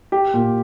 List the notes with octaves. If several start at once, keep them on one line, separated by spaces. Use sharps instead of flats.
G4
A#2